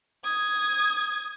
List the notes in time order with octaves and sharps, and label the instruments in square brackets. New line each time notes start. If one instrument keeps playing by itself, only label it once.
[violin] D#6 G#6